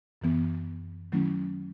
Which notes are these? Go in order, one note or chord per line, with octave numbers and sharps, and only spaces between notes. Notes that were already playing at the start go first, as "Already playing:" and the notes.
F#2 E3 B3
D#3 F#3 A3 C#4 E4